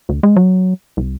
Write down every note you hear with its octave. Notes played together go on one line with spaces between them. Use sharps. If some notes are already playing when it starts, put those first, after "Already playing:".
D2
G#3
F#3
C2